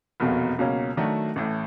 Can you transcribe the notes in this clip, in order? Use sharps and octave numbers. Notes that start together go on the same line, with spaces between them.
F1 E2 B2 F#3 A#3
C#2 B2 F#3 A#3 C#4
D#3 F#3 A3 D4 F#4
A1 A2 E3